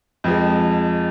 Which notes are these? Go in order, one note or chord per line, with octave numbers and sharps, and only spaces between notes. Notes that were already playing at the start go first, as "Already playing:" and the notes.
F2 F3 G#3